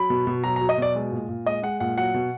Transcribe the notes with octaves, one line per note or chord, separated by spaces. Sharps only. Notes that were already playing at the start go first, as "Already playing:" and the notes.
Already playing: F#3 B5
B2
B2
F#3 A#5
A#5
F#3
D#5
B2 D5
G#3
A#2
A#2
G#3 D#5
G#3 F#5
A#2 F#5
F#3 F#5
B2